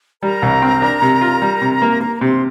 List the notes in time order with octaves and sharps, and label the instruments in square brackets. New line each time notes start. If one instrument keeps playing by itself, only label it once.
[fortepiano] G3 [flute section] A#4 A#5
[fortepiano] C2
C4
D4
C3
F4
G3
C3
A#3
[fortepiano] A#3 [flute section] A#4 A#5
[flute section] A#5
[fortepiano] C3 [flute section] C5 C6